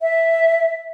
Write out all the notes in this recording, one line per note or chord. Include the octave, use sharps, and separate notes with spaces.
E5